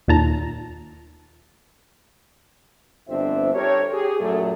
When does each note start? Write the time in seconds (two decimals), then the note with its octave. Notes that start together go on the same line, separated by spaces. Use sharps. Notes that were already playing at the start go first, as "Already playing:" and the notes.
0.08 D#2 A#2 A5 A#5
3.09 G1 F2 C4 D4 C5 E5
3.54 G4 A4 A#4 C5 C#5
3.91 G4 G#4
4.20 F#2 A#2 A3